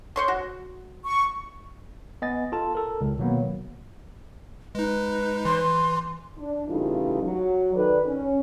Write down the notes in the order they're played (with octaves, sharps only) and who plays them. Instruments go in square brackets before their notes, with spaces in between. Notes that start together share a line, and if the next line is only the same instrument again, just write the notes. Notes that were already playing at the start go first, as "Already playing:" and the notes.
[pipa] C5 C#5 C6
F#4
[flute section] C#6
[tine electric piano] B3 D#5 G#5 A6
F4 A4 A5
A4 A#4
C#2
B2 D#3 F#3 A#3 B3
[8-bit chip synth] G#3 D#4 [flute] B4
[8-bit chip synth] E3 [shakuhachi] C6
[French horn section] D4
C#3 E3 G3 A3 D#4 F4
F#3
D#3 A4 B4 D5
C#4